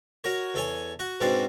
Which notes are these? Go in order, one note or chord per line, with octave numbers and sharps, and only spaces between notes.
F#4 A#4 C#5
E2 A4 C#5 G#5
F#4 F#5
G#2 B2 C4 D4 F#4 D5